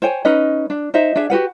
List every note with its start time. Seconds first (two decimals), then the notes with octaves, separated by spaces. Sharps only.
0.02 C5 C#5 G5 G#5
0.25 C#4 D#4 B4 D#5
0.70 D4
0.94 D#4 C5 D#5 E5
1.16 D4 G#4 E5
1.30 F#4 G4 B4 F#5